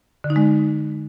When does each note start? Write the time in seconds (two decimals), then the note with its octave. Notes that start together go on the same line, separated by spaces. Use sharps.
0.24 D3
0.30 D#4
0.36 G#3